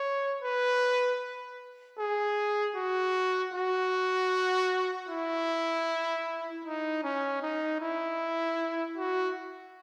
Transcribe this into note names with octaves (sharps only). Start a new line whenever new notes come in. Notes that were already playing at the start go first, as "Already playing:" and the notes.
Already playing: C#5
B4
G#4
F#4
F#4
E4
D#4
C#4
D#4
E4
F#4